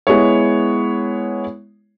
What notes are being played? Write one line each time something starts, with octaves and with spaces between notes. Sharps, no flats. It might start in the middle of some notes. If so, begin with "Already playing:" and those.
G#3 B3 E4 C#5